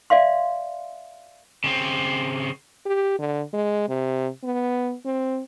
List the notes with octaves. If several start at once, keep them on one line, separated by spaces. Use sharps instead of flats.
D5 E5 F5 C6
C#3 C4
G4
D3
G#3
C3
B3
C4